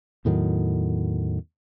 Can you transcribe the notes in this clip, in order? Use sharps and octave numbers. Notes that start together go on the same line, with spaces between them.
E2 A2 D#3 F#3